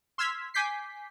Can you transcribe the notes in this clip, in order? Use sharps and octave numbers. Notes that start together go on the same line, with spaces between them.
C6 E6 F6 G#6 B6
G#5 D6 G6 B6 C7